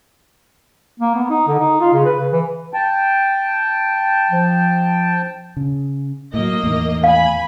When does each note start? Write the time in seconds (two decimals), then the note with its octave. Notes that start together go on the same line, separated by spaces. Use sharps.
1.00 A#3
1.15 B3
1.30 D#4
1.48 D3
1.59 D#4
1.81 F4
1.93 C#3
2.05 B4
2.20 C#3
2.32 E3
2.74 G5 A5
4.31 F3
5.57 C#3
6.34 A2 F#3 A#3 D#5
6.63 E2 A2 D#3
7.04 F5 G#5 B5